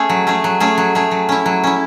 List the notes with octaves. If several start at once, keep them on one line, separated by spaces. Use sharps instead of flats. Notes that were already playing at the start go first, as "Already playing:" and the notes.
Already playing: A3 C#4 G#4
F#3
A3 C#4 G#4
F#3
A3 C#4 G#4
F#3
A3 C#4 G#4
F#3
C#4 E4
F#3
C#4 E4